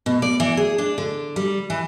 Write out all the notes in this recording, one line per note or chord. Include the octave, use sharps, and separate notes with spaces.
B2
D5
E3
G#4
D4
D3
G3
E3